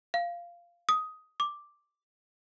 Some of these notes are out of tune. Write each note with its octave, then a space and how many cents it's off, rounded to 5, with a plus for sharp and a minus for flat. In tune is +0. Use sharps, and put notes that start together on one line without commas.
F5 -10
D#6 +10
D6 +0